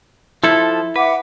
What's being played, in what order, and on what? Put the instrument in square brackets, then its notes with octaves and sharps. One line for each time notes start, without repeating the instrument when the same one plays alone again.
[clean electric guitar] F3 A4 [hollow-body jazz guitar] E4
[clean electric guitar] B4 [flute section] E5 F#5 D6